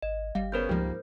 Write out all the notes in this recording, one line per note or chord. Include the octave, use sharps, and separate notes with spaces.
G#1 D#5
G1 G3 F5
C#3 B3 C#4 A#4 C5 G6
C#2 G#2 F3 G3 A#3